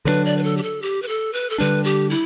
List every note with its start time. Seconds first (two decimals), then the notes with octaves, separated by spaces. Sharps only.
0.05 D3 F#3 A3 D4 B4
0.25 D5
0.37 B4
0.43 A4
0.57 G4
0.63 A4
0.82 G4
1.02 B4
1.08 A4
1.33 B4
1.50 A4
1.58 D3 G3 D4 B4
1.84 G4
2.10 E4